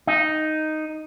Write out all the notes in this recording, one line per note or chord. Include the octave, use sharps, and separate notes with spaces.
D#4